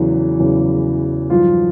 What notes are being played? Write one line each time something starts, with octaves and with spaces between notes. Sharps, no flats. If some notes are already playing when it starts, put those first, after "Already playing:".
Already playing: E2 C#3 E3 F#3
E2 C#3 F#3
G2 D#3 F3 F#3 F4